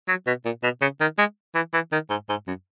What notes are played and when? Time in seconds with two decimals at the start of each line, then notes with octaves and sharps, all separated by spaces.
0.08 F#3
0.27 B2
0.45 A#2
0.63 B2
0.81 C#3
1.01 D#3
1.18 G#3
1.55 E3
1.73 E3
1.92 D#3
2.10 G#2
2.29 G#2
2.47 F#2